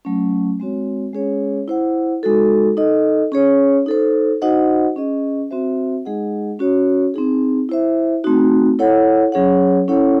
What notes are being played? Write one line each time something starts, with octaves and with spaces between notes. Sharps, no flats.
F#3 A3 C#4
G#3 C4 F#4 C#5
G#3 C#4 G#4 C#5
E4 C5 F#5
G#3 D#4 F#4 A4
D#4 A4 D#5
C#4 G#4 C#5
D#4 A4 C5
D#4 F#4 C5 D#5 F#5
C#4 G#4 D#5
C4 F#4 C5 E5
G#3 D#4 G#4 D#5 F#5
C#4 F#4 C#5
C4 D#4 G#4
E4 C5 E5
A3 C4 D#4 F#4
E4 A4 C#5 F#5
F#3 C#4 G#4 C#5 F#5
C#4 E4 A4 C#5 F#5